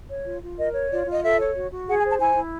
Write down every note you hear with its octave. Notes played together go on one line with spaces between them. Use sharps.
C#5
F4
F4
A#4 D#5
C#5
F4 D5
F4 D#5
A4 E5
C#5
F#4
F#4
G#4 F#5
G#5
C5
A5
E4 G#5
E4